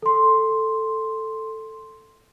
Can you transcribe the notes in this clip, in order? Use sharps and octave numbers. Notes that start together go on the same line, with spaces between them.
A4 C6